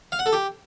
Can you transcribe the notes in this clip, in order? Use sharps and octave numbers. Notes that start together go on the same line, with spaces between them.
F5
F#5
A4
G4